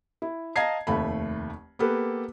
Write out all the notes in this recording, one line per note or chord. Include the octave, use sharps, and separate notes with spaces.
E4
D#5 F5 A5 A#5 G#6 C7
F1 D#2 A3 B5
A#3 B3 G4 A4 B4